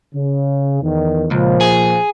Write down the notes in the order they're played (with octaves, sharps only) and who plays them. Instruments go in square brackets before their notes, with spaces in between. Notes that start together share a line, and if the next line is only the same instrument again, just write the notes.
[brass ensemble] C#3
E2 D#3
[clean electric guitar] C#2 [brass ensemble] A#2 F3
[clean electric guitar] G#4